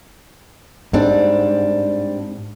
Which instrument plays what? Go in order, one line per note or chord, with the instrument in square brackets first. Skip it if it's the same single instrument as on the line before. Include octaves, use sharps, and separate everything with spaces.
[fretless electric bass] G#2 [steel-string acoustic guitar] G3 C4 D4